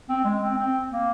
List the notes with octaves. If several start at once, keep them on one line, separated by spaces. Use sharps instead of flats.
C4
G#3
C4
C4
A#3